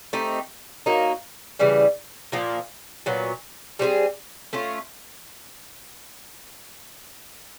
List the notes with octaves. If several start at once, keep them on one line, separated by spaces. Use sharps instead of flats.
A3 C4 D#4 G4
F#3 A#3 D#4
C#3 E3 G3
A#2 F3 A#3
A#2 F#3 B3
G3 C4 F4 G#4
A3 C#4 F4